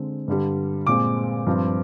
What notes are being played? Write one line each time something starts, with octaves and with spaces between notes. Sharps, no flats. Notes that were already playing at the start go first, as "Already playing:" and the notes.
Already playing: D3 G#3 C4
G2 D3 G3
A#2 G#3 C4 D6
G2 F3 C4